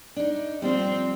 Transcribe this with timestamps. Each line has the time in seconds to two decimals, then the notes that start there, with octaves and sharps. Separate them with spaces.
0.16 D4 D#4
0.62 F3 G3 C4